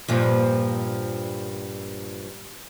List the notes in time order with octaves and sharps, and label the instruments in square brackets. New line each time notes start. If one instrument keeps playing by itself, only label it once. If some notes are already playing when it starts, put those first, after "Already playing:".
[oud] G2 A#2 F3